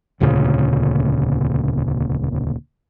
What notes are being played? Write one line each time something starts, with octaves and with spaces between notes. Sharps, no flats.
E1 D2 A#2 C#3